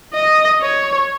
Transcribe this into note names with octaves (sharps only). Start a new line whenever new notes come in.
D#5
C#5